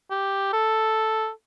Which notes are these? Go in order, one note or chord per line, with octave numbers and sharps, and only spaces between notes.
G4
A4